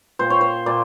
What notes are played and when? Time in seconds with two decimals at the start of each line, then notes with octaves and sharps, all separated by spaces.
0.19 A#2 C5
0.30 C#5
0.41 C5
0.66 A#2 D5